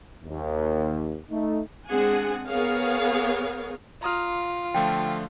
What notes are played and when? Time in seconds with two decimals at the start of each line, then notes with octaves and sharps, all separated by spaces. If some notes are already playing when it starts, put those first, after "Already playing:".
0.24 D#2
1.30 A3 D#4
1.87 G#3 C4 D4 G#4 F#5 G#5
2.47 B3 G#4 A#4 C#5 F5
4.03 F4 A#5 D#6 F6
4.74 D3 F3 A3 G5